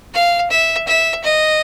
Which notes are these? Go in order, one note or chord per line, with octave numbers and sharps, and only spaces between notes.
F5
E5
E5
D#5